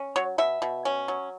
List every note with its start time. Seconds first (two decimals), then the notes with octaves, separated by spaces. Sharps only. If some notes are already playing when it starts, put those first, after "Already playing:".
Already playing: C#4
0.16 F#3 C#5
0.38 B2 E5
0.62 B2
0.85 C#4
1.08 F#3